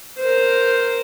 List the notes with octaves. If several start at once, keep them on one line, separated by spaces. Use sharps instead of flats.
A#4 C5